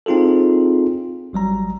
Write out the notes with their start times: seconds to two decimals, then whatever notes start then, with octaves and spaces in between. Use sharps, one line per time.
0.06 C4 D#4 F4 G#4 A4
1.33 G#1 F#3 G3 A#5